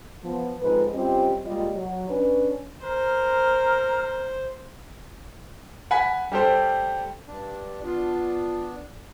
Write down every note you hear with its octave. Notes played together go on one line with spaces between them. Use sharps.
F3 B3
F2 G#2 F3 B4
G3 C4 C#4 F4 G4 D#5
A#2 G3 G#3 F4 D5 D#5
F#3
C#4 D4 B4
A#4 C5
F#5 G#5 B5 G#6 B6
G3 G4 A4 C5
G2 D4
B3 D4 F4